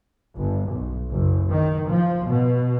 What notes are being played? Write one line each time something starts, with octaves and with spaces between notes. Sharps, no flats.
G1
B1
F#1
D#3
F3
B2